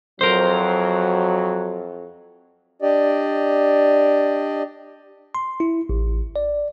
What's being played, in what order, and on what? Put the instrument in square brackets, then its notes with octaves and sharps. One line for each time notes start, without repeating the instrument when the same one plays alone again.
[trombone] F2 [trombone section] F#3 [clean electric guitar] A#4 C5
[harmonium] D4 G4 D5 D#5
[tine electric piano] C6
E4
A1
D5